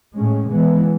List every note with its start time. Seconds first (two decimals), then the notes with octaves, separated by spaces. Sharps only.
0.15 A2 G#3 C#4
0.49 E3 G#3 B3